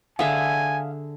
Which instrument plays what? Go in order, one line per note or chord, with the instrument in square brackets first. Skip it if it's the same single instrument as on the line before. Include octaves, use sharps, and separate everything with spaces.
[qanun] D3 G#4 E5 [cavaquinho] F5 D#6 [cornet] G#5